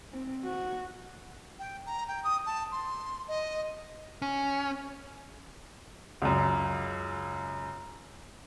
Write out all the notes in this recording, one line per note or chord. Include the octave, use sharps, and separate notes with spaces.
C4
F#4
G5
A#5
G5
D#6
A5
C6
D#5
C#4
C#2 F#2